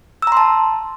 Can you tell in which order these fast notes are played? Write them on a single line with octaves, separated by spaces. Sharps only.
E6 A#5 C6 A5